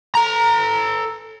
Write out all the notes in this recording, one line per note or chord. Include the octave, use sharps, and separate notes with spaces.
A4 A#5